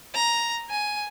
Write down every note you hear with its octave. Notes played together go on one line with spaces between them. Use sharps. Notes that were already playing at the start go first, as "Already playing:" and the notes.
A#5
G#5